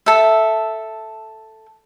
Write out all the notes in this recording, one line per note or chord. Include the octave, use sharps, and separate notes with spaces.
A4 E5